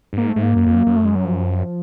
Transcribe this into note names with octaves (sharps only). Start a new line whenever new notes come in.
G2
G#2 A#3
A3
G#2
A#3
F#2
F2
F#2
F#2
A3
G#3
F#3
F3